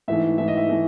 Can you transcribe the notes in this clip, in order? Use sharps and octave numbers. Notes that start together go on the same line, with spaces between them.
G#2 E3 A3 E5
G#2 E3 A3 E5
D#5
E5
E3 A3